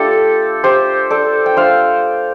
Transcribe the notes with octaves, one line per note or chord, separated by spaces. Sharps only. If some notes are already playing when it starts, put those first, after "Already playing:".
Already playing: A3 D4 F4 G4 A4
G4 C5
A4 D5
G5
A3 D4 F4 C5 F5